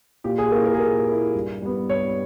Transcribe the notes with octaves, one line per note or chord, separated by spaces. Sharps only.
A#2 G4
G#4
A#3 E4 A#4
A#4
G#4
A#2 A#4
A#3 E4
G2
G3 B3
G2 C#5